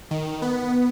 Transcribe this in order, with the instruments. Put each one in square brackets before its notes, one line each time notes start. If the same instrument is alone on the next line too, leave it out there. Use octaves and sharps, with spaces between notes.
[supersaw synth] D#3
B3